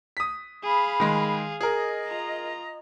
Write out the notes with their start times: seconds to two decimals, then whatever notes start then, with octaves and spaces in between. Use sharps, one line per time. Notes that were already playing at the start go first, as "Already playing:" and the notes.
0.17 D#6 B6
0.63 G#4 F5 B5
1.00 D#3 G#3
1.61 G#4 A#4 D#5
2.07 F4 A#5